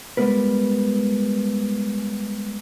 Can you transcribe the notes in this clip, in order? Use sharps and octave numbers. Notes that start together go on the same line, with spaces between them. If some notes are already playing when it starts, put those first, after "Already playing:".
G3 G#3 B3 A#4 B4